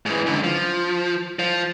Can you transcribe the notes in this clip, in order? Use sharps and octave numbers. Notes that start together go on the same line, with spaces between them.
G#2 E3
F#2 D3
F3
F3